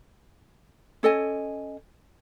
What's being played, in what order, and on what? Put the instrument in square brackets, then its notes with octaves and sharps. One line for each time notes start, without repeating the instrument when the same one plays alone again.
[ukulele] C#4 A4 D#5 G#5